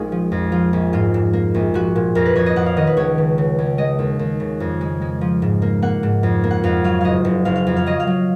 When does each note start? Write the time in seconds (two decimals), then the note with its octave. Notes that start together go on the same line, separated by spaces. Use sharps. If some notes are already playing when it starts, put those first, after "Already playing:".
Already playing: A#1 G#3 D#4 F4 G#4
0.12 F3
0.32 F2
0.52 F3 F4
0.73 A#1
0.93 G#2 F4
1.14 G#2
1.33 A#3
1.54 A#1
1.74 F3 F#4
1.96 A#2
2.15 F2 A#4
2.25 B4
2.36 F2 C#5
2.46 D#5
2.56 F2 F#5
2.66 F5
2.77 D#3 D#5
2.87 B4
2.97 C#2 C#5
3.18 C#3
3.38 C#3
3.58 C#2
3.78 G#3 D#5
3.99 D#2
4.19 D#2
4.40 C#3
4.60 F2
4.81 G#3
5.02 G#3
5.21 F3
5.42 G#2
5.62 A#3
5.82 A#3 F#5
6.03 G#2
6.23 F2
6.44 A#3
6.51 F#5
6.64 F2 F5
6.84 F#3 F5
7.01 F#1 D#5 F5
7.25 F#1
7.45 F#1 F5
7.56 F5
7.67 F2
7.76 F5
7.86 F#3 D#5
8.00 F5
8.07 F#3